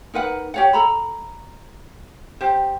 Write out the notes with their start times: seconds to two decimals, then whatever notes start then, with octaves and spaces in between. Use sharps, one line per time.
0.14 D#4 A#4 B4 F#5
0.54 G4 C#5 F#5
0.73 A4 A#5 B5
2.41 G4 C5